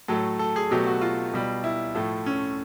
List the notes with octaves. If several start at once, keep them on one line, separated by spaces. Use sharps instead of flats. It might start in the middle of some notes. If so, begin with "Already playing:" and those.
A2 F#3 A3 A4
A4
G#4
B2 F#3 A3 G4
F#4
F4
B2 G3
E4
A2 F3 A3
C#4